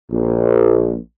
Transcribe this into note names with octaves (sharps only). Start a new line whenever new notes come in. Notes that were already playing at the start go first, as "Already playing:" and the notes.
A#1